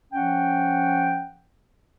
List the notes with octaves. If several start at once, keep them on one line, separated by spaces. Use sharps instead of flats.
F3 C#4 F#5 G5